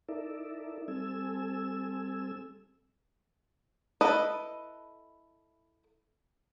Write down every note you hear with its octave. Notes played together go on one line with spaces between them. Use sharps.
D#4 E4 A4 A#4 D5 E5
G3 C4 A4 G#5 E6
E4 A4 B4 D#5